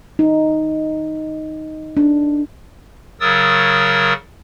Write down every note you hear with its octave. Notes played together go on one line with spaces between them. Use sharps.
D#4
D4
C#3 F#3 A#4 D#6 E6 A6